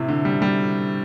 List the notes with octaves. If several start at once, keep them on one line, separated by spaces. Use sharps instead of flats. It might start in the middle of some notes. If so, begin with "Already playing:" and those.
Already playing: A2 C3
D3
G3
G3